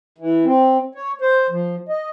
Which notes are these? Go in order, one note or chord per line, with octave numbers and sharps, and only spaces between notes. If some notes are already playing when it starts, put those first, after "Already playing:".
E3
C4
C#5
C5
F3
D#5